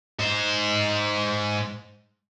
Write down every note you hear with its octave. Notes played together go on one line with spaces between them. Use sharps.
G#2 C5